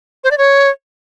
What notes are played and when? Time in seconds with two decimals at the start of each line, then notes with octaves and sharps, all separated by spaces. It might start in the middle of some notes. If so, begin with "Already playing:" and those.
0.24 C5
0.31 D5
0.38 C#5